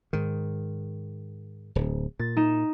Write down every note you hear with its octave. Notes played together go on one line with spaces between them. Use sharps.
G#2 D#3
D1
A#2 A6
D#4 D#7 E7